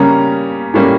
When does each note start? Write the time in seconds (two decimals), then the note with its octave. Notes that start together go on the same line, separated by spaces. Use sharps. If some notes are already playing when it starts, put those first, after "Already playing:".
Already playing: C#3 G3 A#3 C#4 A#5
0.74 A2 G3 A#3 C#4